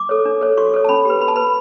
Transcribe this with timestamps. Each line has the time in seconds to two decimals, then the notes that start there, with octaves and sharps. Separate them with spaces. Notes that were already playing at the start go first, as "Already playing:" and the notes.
Already playing: D6
0.09 A4 C#5
0.25 D4
0.41 A4 C#5
0.57 F#4 C#6
0.74 A4 C#5
0.84 A5
0.89 C#4 B5
1.05 G4 B4
1.21 F#4 B5
1.28 A5
1.36 B4 B5